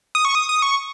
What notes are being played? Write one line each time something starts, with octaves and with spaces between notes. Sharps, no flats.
D#6
C#6
D#6
D#6
C#6